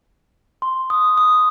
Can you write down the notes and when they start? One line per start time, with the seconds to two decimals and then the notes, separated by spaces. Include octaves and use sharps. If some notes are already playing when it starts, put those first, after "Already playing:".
0.62 C6
0.90 D#6
1.17 D#6